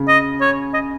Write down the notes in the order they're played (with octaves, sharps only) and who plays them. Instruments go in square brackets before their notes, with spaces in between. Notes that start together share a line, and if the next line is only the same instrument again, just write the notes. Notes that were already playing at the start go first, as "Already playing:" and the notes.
Already playing: [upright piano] C#3
[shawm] D#5
C#5
D#5